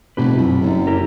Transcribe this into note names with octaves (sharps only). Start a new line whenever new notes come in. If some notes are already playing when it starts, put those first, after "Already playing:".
F1 B2 G4 B4
C2 F#2
F#1
E4 G4 A#4